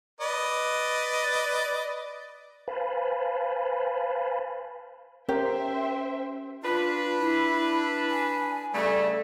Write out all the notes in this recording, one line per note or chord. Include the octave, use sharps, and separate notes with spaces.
B4 D5 D#5
B4 C5 F5 G#5 A5 B5
C#4 G4 A#4 C5 E5 G5
D4 F4 B4
E4
G#5
C#3 G3 A3 D5